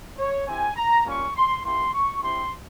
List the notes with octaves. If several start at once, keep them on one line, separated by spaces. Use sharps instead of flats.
C#5
C4 E4 G4 G#5
A#5
G3 A#3 C#4 F4 C#6
C6
A#3 E4 G4 C6
C#6
C4 E4 G4 C6